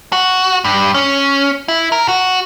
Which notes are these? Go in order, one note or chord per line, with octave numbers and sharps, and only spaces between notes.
F#4
G2
C#4
E4
A#4
F#4